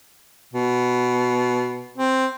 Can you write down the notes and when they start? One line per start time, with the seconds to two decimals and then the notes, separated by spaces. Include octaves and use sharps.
0.54 B2
1.98 C4